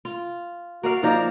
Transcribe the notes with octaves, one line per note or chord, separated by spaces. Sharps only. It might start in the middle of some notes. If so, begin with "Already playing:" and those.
F4
A#3 F#4 D5 F5
F3 A#3 D#4 D5 A#5